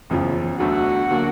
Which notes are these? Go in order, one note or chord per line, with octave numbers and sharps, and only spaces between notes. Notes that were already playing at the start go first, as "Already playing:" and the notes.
F#1 E2 C#3 F3
E1 D2 D3 F#3 A3 F#4
D3 F#3 A#3